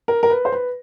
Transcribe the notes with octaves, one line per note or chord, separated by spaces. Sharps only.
A#4
A#4
B4
C5
B4